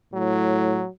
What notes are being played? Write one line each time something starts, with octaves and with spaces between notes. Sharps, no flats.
A2 F#3